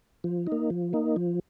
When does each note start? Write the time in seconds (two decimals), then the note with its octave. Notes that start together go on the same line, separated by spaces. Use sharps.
0.24 F3
0.47 D#4
0.52 A#3
0.70 F3
0.93 A#3 D#4
1.16 F3